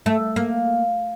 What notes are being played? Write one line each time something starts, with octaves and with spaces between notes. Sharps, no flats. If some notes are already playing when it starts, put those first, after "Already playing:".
A3
A#3